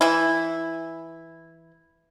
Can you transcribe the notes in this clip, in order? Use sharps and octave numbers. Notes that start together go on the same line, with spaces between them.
E3 E4